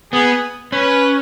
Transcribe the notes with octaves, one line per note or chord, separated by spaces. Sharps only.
B3 G#4
C#4 B4